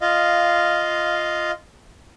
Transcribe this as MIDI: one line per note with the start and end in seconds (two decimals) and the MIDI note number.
0.01 1.51 65
0.01 1.51 75
0.01 1.51 77